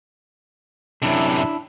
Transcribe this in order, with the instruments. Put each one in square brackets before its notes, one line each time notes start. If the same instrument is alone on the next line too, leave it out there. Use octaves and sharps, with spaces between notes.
[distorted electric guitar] F#2 C3 [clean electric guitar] D4 E4